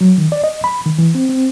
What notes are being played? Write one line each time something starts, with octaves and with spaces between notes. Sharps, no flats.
F#3
D#3
D5
D#5
B5
D#3
E3
C4
C4